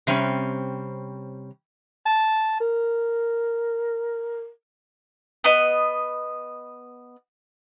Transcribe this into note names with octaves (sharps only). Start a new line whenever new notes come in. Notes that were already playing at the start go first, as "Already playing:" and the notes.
C3 G3 C4 C#4
A5
A#4
B3 D#5